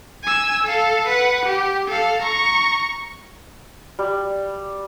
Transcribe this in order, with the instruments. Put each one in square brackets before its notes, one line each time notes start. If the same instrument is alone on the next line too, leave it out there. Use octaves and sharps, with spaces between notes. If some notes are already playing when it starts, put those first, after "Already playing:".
[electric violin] G#5 E6
A4 F5
B4 F#5
G4
A4 F5
A#5 C#6
[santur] G3